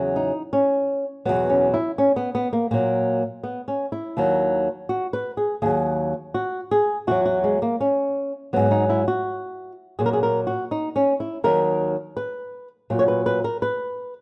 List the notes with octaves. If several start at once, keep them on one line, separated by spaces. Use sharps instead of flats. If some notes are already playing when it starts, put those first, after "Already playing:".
Already playing: E2 C#3 F#3
D#4
C#4
E2 B2 F#3 B3
C#4
E4
C#4
B3
B3
A#3
A#2 F#3 A#3
B3
C#4
E4
D#2 D#3 F#3
F#4
B4
G#4
D#2 D#3 F#3 G#4
F#4
G#4
E2 D#3 F#3 F#4
F#4
G#3
A#3
C#4
G#2 F#3 B3
D#4
E4
F#4
A#2 F#3 G#4
A#4
G#4
A#4
F#4
D#4
C#4
E4
D#2 D#3 F#3 A#4
B4
A#2 F#3
C#5
B4
B4
A#4
B4